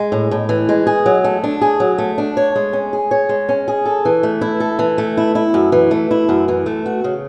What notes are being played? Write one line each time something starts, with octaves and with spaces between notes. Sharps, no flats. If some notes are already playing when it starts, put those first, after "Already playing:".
Already playing: G#3
A2
A2
E3
G#3
G#4
F#3
A3
D4
G#4
F#3
A3
D4
C#5
G#3
C#4
G#4
C#5
G#3
C#4
G#4
A4
E3
A3
E4
A4
E3
A3
E4
E4
F#2
E3
A3
E4
F#2
E3
A3
F#4
C#3